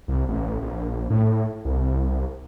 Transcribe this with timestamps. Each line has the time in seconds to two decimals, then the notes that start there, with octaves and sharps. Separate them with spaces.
0.08 C2
0.29 A1
0.62 A#1
1.10 A2
1.65 C2